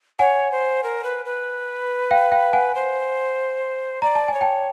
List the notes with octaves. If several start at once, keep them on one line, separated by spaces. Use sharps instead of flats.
C#5 F#5 G#5
C5
A#4
B4
B4
F5 G5
F5 G5
F#5 G#5
C5
D5 A#5
A5
G#5
C#5
G5 A5